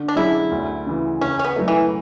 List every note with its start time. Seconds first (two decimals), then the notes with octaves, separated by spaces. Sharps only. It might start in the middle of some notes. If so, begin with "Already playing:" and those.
Already playing: D3
0.08 D4
0.16 F#3 C#4 E4 G#4
0.51 D2
0.86 C#3 E3
1.21 C#3 C#4
1.39 C#4
1.44 B3
1.56 F#3 A3
1.68 E3